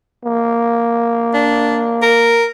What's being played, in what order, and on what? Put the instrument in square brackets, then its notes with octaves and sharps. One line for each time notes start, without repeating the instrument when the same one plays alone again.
[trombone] A#3
[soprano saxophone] D4
A#4